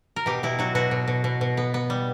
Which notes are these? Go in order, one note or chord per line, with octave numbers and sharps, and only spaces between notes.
A#4
B2 G4
B2 E4
F#3 F#4
B2 F#4
B2
B2
B2
B2
B3
B3
G3